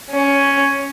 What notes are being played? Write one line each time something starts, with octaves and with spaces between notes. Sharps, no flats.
C#4